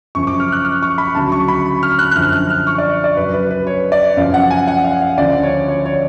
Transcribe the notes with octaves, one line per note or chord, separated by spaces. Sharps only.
F#2 C#3 F3 C#6
D6
F6
F#6
F6
C#6
B5
D2 C#3 F#3 A5
C#6
B5
F6
F#6
F#6
F#2 D3 F3 F6
F#6
F6
C#6
D5
D5
F#2 C#3 F#3 B4
B4
B4
C#5
D5
F#2 C#3 F3 F5
F#5
G#5
F#5
F5
F5
D2 C#3 F3 D5
C#5
C#5
C#5